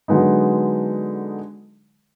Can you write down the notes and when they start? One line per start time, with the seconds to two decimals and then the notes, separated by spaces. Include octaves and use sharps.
0.08 D3 F#3 G#3 B3 D#4